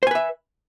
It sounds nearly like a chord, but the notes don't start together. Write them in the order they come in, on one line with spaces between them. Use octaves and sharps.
C5 G#5 B4 E5